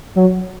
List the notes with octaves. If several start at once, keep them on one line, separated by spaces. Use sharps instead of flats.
F#3